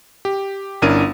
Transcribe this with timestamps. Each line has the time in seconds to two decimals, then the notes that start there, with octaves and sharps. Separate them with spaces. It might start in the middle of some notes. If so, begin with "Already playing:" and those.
0.25 G4
0.82 G1 C#4 D4 E4 A#4 D#7